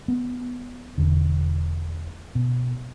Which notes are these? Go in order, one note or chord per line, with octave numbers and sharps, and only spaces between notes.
B3
E1 E2 D3
B2